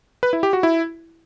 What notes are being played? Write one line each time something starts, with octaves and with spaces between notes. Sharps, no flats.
B4
E4
G4
F#4
E4